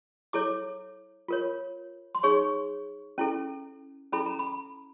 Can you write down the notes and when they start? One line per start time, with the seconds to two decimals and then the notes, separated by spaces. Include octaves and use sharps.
0.33 E4 A4 C#5 D6
1.28 F4 A#4 C#5
2.15 C6
2.23 D#4 G#4 C#5 C#6
3.18 C#4 E4 A4
4.12 C#4 E4 A4 B5
4.26 A#5
4.39 B5